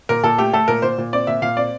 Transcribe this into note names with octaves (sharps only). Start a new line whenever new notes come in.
A#2 A#4
A#2 A4
A3 G4
A3 A4
A#2 A#4
A#2 C5
A#2
C4 D5
A#2 E5
A#2 F5
C4 D5